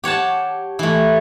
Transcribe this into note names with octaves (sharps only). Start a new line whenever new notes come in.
G4 C#5 F#5 A5
E3 A3